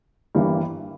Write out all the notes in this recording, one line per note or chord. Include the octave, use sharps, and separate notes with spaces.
G1 G2 E3 G3 A#3